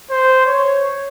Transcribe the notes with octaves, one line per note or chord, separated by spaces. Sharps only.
C5
C#5